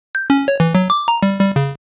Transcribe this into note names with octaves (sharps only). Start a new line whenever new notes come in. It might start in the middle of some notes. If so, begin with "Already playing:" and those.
G6
C#4
C#5
E3
F#3
D6
A#5
G3
G3
C#3